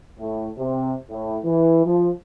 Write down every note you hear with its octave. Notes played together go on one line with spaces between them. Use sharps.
A2
C3
A2
E3
F3